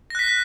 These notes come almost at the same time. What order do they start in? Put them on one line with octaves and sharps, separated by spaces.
A#6 F#6 B6